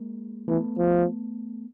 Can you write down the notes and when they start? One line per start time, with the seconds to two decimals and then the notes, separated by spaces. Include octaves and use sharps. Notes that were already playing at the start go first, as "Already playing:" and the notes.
Already playing: G#3 A#3
0.48 E3 A3 B3
0.78 F3